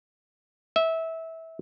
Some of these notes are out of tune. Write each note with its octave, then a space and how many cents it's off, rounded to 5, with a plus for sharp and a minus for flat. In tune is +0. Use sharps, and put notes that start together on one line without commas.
E5 -20